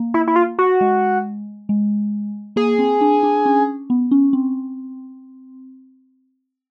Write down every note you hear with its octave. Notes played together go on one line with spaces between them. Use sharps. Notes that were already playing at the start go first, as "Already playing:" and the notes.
Already playing: A#3
E4
E4
F4
F#4
G#3
G#3
A#3 G#4
C4
D4
D4
C#4
B3
C#4
C4